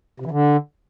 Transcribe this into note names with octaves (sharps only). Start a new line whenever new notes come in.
C3
E3
D3